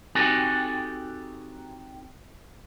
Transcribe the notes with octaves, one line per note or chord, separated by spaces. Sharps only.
C4 D#4 F#4 G4 A4 G#5